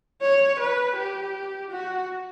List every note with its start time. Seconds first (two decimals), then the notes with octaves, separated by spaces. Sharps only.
0.22 C#5
0.60 B4
0.97 G4
1.71 F#4